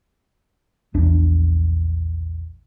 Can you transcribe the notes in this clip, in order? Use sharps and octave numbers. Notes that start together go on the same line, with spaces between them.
A#1 E2 D4